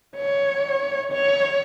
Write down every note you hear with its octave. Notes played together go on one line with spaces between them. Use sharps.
C#5
C#5